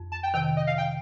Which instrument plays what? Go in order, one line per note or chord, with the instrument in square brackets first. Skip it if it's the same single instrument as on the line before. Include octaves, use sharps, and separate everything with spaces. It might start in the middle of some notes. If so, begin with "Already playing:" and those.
Already playing: [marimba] F2
[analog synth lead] A5
G5
[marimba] C3 D#3 [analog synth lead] G5
[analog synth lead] D#5
F5
G5